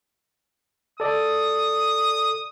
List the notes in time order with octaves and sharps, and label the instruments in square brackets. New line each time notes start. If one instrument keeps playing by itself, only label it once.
[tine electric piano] A4 D5 [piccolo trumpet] D#6